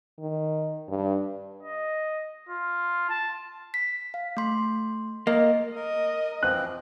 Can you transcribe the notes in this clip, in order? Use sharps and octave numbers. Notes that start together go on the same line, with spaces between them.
D#3
G2
D#5
F4
A5
B6
F5
A3 C6
A#3 D#5
A#4 D#5
E3 F3 C4 F#6